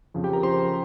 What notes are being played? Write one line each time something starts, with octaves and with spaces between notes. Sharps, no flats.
F2 C#3 F3
G4 G5
A#4 A#5
C5 C6